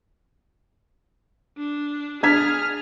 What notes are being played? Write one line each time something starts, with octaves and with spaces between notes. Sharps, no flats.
D4
D4 G#4 F6 G#6 B6